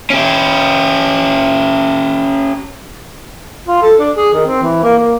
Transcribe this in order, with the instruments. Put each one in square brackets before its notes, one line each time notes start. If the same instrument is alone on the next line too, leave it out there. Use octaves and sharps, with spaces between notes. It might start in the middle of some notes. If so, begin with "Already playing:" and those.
[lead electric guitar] C#4 G4
[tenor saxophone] F4
A4
D4
G#4
D#3
C4
E3
A#3
A#3